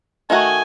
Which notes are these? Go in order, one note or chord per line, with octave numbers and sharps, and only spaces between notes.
D#3 A3 D#4 F#4 G#5